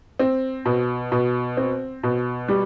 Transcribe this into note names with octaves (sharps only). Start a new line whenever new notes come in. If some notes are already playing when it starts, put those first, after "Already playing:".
C4
B2
B2
C4
B2
G3